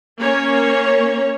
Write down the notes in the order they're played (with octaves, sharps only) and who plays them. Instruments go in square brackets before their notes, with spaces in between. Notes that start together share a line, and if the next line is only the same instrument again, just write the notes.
[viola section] A#3 C#4 C#5